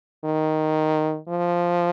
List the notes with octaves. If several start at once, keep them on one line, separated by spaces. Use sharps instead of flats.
D#3
F3